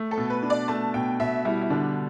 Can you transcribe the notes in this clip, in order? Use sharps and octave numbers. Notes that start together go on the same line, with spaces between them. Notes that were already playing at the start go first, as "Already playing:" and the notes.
Already playing: A3
A4
B2
B4
D4
D5
A3 A5
B2 G5
B2 E5
G3 E4
E4
D3 D4